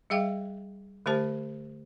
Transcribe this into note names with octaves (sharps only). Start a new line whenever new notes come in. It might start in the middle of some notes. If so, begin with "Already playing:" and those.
G3 G#4 E5 F5 G5
D3 A3 G4 C5 A5